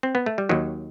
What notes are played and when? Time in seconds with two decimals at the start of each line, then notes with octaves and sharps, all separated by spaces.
0.03 C4
0.15 B3
0.26 A3
0.38 G3
0.49 D#2 D#3 F#3